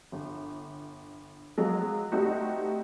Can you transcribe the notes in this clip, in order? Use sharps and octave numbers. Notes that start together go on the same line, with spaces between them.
G1
F3 F#3 G#3
G3 A3 C4 D#4 F#4 G4